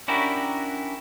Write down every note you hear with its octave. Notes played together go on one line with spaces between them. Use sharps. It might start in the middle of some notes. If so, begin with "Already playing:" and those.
C#4 D4 E4 F#4 G4 A#4